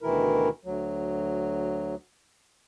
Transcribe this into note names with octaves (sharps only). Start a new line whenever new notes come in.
D2 B2 D#3 E3 E4 A#4
D2 F#3